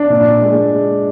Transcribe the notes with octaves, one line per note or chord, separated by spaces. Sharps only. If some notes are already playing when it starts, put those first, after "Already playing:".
Already playing: D4
A#2
G#3